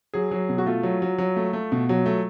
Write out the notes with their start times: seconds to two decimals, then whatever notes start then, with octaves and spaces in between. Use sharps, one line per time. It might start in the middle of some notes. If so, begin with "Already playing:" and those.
0.14 F#3 G#4
0.31 F#3
0.49 B2
0.58 F#4
0.66 A3 F4
0.83 F#3
1.02 F#3
1.18 F#3
1.37 A3
1.53 A3
1.72 B2
1.89 F#3
2.06 A3